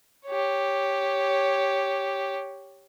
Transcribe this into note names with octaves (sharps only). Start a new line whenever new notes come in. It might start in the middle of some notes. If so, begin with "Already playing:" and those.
G4 C#5